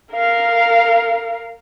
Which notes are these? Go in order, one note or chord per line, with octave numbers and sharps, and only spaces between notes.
A#4 F5